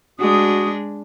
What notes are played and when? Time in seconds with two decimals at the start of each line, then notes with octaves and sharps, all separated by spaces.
0.20 G#3 D4 F#4 D#6